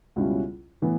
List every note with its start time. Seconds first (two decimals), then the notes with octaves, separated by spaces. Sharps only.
0.16 C#2 B2 G3 C#4 E4
0.82 A2 E3 B3